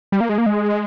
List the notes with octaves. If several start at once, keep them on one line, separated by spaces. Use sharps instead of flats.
G3
A#3
G#3
A#3
G#3